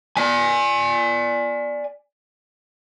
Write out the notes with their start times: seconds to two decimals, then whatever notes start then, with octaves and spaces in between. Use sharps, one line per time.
0.17 D5 G#5